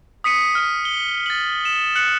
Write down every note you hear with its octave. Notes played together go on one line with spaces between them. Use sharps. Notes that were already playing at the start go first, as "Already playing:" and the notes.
D#6 B6 C#7 D#7
F6 D#7
G7
A6 F#7
E7
F#6 C#7 F#7